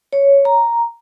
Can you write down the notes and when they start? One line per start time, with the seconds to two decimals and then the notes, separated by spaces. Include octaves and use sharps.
0.13 C#5
0.45 A#5